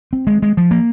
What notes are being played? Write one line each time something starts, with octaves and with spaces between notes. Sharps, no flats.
C4
G#3
G#3
F3
A#3